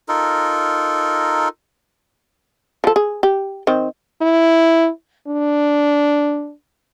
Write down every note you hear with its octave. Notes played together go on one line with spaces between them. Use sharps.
D#4 F4 A4 A#4
F3 A4
G#4
G4
D#3 C4
E4
D4